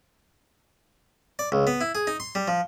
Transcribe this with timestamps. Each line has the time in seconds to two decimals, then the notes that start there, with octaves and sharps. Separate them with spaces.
1.39 D5
1.52 C#2
1.67 B3
1.81 E4
1.95 G#4
2.07 D#4
2.20 C6
2.35 G3
2.48 F3